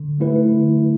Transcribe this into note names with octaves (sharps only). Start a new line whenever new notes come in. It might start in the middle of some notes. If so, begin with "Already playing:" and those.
Already playing: D3
F#3 A3 E4 B4
D3